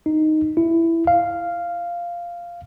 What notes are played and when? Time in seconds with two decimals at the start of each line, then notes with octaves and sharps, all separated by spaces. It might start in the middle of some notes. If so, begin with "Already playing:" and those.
0.06 D#4
0.57 E4
1.07 F5